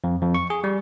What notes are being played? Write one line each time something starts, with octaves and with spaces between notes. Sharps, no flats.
F2
F2
C#6
G#4
G3